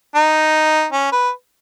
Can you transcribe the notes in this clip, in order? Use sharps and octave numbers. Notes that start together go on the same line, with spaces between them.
D#4
C#4
B4